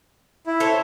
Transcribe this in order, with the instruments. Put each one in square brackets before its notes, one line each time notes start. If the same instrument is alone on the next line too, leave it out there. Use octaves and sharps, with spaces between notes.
[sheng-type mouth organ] E4
[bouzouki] A4 C5 C#5